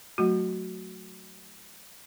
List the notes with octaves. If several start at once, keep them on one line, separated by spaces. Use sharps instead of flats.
F#3 A3 F#4